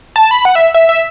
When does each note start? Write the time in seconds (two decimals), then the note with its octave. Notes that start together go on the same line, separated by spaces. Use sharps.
0.16 A5
0.31 B5
0.45 F#5
0.55 E5
0.74 E5
0.89 E5